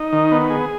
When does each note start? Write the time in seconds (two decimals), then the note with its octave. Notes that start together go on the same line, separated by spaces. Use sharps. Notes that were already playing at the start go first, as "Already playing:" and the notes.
Already playing: D#4
0.13 D#3
0.32 B3
0.50 G#4